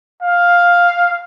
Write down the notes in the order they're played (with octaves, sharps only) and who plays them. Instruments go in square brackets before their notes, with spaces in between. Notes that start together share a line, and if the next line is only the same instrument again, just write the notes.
[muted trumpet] F5